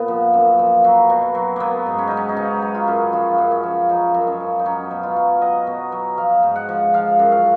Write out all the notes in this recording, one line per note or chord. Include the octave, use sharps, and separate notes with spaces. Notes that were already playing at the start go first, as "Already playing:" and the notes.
Already playing: A#2 B3
F3
F#2
F3
F#3
B2
F#3
F#3 A#3 B3
G#2
C#4
F#3 D#4
C#4
D#4
C#3 C#4
F#3
F4
F#2
F3 F4
F#2
C#4
F3
F3 D#4
F#2
C#4
F3
D#4
F#3 C#4
B2
F4
F#3
F#3 D#5
B2
F#3
F3 F5
G#2
F#5
F3
F3 F5
F#2
F5